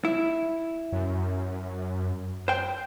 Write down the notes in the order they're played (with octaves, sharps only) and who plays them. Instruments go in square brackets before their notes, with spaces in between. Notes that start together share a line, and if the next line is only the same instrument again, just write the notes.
[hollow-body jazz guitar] E4
[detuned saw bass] F#2
[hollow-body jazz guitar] C5 G5